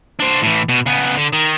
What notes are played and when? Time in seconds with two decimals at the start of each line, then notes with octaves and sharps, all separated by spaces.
0.20 D4 C5
0.43 A2 E3
0.69 B2
0.86 C#3 B3
1.17 D3
1.33 D#3